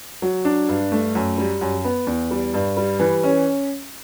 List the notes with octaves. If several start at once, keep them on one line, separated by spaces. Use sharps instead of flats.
F#3
D4
G2
A3
F#2
G3
F#2
B3
E2
G3
G2
G3
E3
C#4